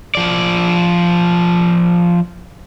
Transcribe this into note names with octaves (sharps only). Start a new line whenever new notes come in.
F3 D5